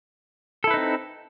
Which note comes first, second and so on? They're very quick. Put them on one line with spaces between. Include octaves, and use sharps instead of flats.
A4 E4 B4 D#4 C4